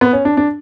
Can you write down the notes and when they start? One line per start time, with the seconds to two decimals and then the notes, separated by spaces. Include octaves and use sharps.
0.01 B3
0.13 C#4
0.25 D4
0.37 D4